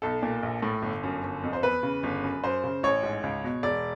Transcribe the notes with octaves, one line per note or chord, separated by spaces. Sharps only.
B1 A4
A#2
A#1
A2
G1
F#2
G1
F2
C5
E2 B4
C#3
G1
F#2
F#2 C5
C#3
A1 C#5
G#2
C#2
B2
E1 D5